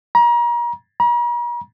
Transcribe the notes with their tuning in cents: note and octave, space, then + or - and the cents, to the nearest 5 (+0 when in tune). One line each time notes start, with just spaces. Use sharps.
A#5 +35
A#5 +45